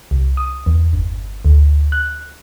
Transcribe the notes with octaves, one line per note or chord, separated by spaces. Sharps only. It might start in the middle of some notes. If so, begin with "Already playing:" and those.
C2
D#6
E2
G1
D2
F#6